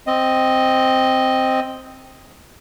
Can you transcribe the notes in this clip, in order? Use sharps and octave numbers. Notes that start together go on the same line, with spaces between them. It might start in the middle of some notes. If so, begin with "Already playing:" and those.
C4 D#5